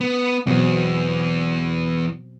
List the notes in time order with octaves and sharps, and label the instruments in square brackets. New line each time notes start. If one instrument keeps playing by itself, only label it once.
[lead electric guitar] B3
[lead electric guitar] E2 [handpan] B2 F#3 C4